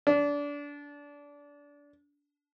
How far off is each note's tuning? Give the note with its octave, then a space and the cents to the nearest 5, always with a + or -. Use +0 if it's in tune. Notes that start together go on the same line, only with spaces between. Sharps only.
D4 -25